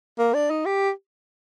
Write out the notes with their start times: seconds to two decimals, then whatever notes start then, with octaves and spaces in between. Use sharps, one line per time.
0.19 A#3
0.34 D4
0.50 D#4
0.65 G4